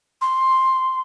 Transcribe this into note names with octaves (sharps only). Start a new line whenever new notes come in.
C6